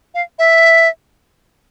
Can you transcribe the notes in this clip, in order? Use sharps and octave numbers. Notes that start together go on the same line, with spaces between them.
F5
E5